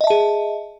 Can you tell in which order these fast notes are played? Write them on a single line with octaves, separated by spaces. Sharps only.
D#5 E5 A5 G#4